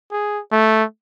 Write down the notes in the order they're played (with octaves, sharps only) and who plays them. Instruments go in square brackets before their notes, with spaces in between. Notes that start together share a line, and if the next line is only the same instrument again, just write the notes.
[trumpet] G#4
A3